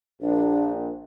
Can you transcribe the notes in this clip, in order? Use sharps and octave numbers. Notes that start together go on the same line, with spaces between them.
A#1 D4